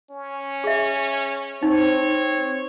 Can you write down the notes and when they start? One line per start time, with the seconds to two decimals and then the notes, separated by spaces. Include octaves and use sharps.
0.10 C#4
0.64 G#4 E5
1.63 C4 D#4 C#5